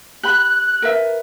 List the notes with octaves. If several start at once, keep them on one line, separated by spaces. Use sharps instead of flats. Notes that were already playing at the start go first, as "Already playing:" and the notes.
G4 B5 F#6
A#4 B4 E5